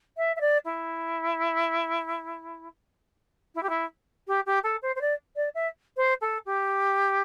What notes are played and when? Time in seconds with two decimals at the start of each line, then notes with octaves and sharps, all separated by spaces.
0.17 E5
0.36 E5
0.41 D5
0.65 E4
3.55 E4
3.63 G4
3.69 E4
4.28 G4
4.46 G4
4.64 A4
4.82 C5
4.96 C5
5.01 D5
5.36 D5
5.55 E5
5.97 C5
6.21 A4
6.46 G4